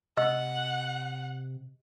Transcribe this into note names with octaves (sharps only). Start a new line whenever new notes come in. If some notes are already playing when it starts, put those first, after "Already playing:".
C3 D#5 F#5 E6